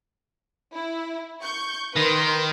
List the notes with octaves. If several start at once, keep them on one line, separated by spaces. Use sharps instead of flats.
E4
C#6 G6
D#3 B4 C6